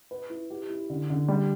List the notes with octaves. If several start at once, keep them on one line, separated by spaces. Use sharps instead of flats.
B4
E4
G4
E4
D3
D3
G3